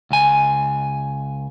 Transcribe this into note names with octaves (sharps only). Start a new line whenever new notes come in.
C#2 G#5